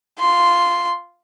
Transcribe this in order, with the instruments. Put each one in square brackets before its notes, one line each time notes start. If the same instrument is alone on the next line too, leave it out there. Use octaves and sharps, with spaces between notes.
[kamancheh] F4 C6